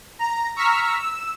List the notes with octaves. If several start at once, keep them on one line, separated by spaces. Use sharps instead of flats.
A#5
A#5 C#6 E6 F6 B6
E6